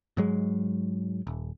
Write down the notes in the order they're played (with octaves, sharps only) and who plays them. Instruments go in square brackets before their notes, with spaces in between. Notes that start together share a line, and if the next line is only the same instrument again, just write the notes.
[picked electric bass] G#2 F#3 G#3
D#1